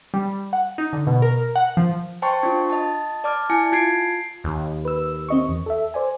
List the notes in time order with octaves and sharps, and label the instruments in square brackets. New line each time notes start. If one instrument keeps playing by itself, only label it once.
[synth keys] G3
F#5
D#4
D3
B2
A#4
F#5
F3
[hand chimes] C5 G5 A5 C6 C#6
D4 F4
D#5 A5
D5 A5 D6 F6
E4 G#5 A5 C#7
F4 A5 G#6 C7 D7
[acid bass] D#2
[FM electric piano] B4 E6
C4 D#5 C#6
E2
A4 E5
C5 D5 G#5